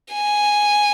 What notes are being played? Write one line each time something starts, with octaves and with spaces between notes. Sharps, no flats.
G#5